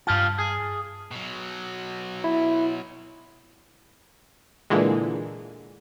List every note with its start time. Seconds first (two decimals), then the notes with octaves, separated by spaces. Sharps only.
0.07 G2 F4 G4 F5 A5
0.38 G#4
1.11 B2 F#3
2.24 E4
4.70 A#2 D3 E3 G#3